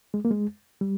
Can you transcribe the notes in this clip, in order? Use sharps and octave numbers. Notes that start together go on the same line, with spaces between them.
G#3
A#3
G#3
G3